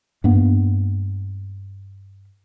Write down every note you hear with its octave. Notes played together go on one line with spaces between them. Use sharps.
G2 A#3 B3